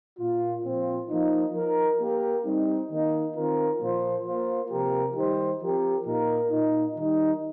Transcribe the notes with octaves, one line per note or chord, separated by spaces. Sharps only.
A#2 A#3 F4
A#2 F3 C4 F4 C5
F3 A#3 D#4
F3 D#4 A#4
A#3 G4 A#4
G3 C4 D#4
D#3 A#3 D#4
D#3 C4 F4 A#4
A#2 F3 A#3 F4 C5
A#3 F4 C5
C3 F3 A#3 G4 A#4
D#3 G3 D#4 G4 C5
F3 C4 G4 A#4
A#2 A#3 D#4 A#4
A#2 A#3 D#4
D#3 G3 D#4